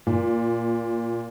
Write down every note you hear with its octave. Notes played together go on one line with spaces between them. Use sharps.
A#2